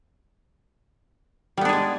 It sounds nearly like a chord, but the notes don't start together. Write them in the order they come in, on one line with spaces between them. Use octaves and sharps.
G3 B3 D4 G#4 G#3